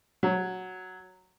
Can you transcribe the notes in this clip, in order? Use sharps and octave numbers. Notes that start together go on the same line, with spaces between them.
F#3